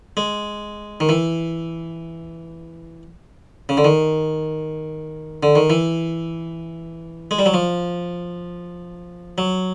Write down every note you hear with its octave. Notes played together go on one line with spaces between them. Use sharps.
G#3
D#3
E3
C#3
D3
D#3
D3
D#3
E3
G#3
G3
F#3
F3
F#3